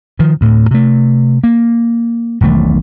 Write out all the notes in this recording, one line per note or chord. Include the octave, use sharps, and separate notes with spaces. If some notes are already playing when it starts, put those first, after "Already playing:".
D#3 F3
D2 A2
C3 A3
A#3
E1 B1 D#3 A3